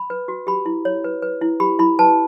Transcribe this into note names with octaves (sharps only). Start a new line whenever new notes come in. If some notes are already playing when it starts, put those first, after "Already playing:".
Already playing: B5
B4
F#4
G4 B5
E4
C#5
B4
B4
E4
G4 B5
E4 B5
B4 A5